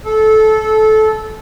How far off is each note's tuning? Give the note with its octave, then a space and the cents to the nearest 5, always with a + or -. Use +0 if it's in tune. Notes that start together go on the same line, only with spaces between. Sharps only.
A4 -20